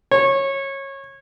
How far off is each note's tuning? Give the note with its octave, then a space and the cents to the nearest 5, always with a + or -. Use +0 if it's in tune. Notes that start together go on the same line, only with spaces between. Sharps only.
C#5 -20